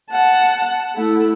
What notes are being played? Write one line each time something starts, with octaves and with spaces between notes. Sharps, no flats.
F#5 A5
A3 E4